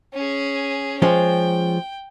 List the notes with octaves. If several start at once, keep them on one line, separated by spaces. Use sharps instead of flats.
C#4 G#4
F3 G#3 C#4 G5